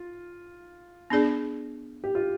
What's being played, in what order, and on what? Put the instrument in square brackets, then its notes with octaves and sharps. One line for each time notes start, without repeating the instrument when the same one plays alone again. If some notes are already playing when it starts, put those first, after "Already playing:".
Already playing: [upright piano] F4
[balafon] B3 D4 G#4 D5
[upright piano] G4
F4